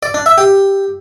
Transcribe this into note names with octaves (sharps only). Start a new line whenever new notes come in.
D5
D4
E5
G4